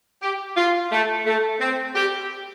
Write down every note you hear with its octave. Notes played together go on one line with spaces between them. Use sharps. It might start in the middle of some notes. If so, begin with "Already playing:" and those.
G4
F4
A3
A3
C4
G4